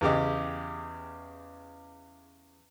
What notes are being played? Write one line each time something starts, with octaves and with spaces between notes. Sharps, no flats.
E2 C#3 G4 D#5